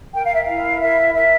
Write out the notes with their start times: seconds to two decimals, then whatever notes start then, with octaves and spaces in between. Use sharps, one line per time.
0.13 A#4 G5
0.23 F5
0.33 E5
0.42 E4 F5
0.80 A#4 E5
1.13 A#4 E5